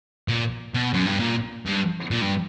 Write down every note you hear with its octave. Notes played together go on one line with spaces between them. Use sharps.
A#2
B2
F#2
G2
A#2
G2
A#2
G2